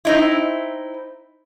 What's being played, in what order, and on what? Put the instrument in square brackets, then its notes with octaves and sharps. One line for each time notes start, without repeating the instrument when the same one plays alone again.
[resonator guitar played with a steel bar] C4 D#4 E4